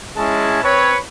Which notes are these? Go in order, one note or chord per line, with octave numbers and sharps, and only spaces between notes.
G#3 C#4 E4 A5
C4 B4 C#5